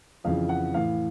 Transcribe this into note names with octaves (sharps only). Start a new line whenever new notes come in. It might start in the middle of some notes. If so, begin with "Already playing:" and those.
F2 C#3 E3 F5
F#5
A2 E3 F5